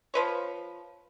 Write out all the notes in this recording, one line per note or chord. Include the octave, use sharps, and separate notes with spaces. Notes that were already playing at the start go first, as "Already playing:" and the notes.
F3 B4 C#5